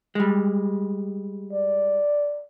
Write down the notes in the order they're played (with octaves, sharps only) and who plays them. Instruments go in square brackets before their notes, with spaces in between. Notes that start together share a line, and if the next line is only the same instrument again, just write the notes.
[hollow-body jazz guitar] G3 G#3
[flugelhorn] D5